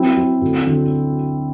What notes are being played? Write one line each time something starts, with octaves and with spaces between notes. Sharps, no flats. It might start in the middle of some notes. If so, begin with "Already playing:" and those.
Already playing: F#3 C4 E4
F#3
D2
D3